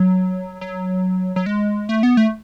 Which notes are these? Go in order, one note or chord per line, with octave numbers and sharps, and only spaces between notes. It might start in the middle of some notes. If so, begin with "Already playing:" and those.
Already playing: F#3
F#3
F#3
G#3
A3
B3
A3